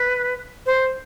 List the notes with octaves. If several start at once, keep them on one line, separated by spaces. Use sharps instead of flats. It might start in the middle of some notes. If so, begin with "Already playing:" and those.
Already playing: B4
C5